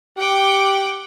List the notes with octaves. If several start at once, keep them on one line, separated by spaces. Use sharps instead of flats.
G4 F#5 G5 D6